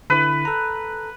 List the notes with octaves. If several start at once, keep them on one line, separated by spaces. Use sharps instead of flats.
D3 E4 B4
A4 A#5